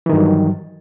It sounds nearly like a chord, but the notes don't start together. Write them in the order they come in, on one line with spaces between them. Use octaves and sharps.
E3 D#3 G2 F#3